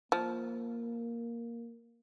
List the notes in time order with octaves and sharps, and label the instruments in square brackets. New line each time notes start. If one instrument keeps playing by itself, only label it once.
[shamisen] F3 [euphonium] A#3